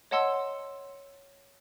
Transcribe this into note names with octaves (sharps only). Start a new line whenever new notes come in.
C#5 D#5 F#5 A5 C6 E6